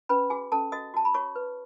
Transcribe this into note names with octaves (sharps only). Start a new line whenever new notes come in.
C#4 B4 B5
F#4 G#4 G#5
C#4 A4 A5
F#4 D#5 D#6
F#4 A5
B5
F#4 C#5 C#6
B4